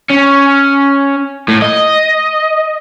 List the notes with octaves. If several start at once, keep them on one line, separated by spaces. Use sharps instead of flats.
C#4
A2
D#5